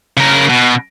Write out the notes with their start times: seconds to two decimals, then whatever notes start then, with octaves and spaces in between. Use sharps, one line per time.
0.17 C#3 A#4
0.49 B2